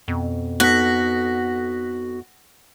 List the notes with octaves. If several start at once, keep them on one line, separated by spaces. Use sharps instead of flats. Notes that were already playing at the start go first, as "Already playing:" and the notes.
F2 B2
B3 D#4 F#4 A4 F#6 A#6 B6